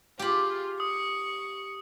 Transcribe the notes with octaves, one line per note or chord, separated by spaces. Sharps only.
F4 G4 G#4 B5
C#6 D#6